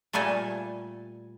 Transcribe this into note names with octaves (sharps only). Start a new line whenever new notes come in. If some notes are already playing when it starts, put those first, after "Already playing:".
A#2 G3 A3 A4 G#5